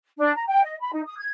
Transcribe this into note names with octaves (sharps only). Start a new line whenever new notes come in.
D4
A#5
G5
D#5
B5
D#4
D#6
G#6